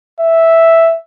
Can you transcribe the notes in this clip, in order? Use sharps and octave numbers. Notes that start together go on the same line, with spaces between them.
E5